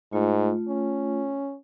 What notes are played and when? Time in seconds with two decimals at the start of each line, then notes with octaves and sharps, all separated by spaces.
0.13 G#2 A3 F4
0.69 C#4